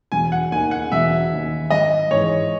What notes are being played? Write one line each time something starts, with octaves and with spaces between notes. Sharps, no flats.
E1 G#5
F#5
D#2 D#3 G#5
F#5
E1 E5
D#2 D#3
G#1 D#5
G#2 E3 G#3 C#5